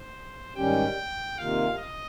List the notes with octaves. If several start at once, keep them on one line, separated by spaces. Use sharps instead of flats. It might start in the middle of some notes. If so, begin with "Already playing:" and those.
Already playing: C5
G#2 D#3 G3 C#4 G4 G5
C3 D#3 A#3 F4 F5
D#5